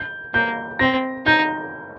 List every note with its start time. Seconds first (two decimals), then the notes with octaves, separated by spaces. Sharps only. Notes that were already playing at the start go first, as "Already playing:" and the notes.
Already playing: G6
0.34 A#3 G6
0.79 C4 A#6
1.26 D#4 G6